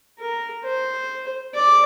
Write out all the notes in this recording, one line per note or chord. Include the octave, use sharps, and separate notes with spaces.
A#4
C5
D5